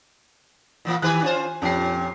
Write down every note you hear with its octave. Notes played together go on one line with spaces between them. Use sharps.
A#2 E3 A#3
D#3 G4 B4 G#5 F#6
C#4 F4 C5
F2 A#2 C#4 G4 C7